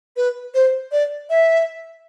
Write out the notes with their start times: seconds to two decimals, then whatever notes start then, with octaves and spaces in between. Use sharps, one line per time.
0.17 B4
0.54 C5
0.92 D5
1.30 E5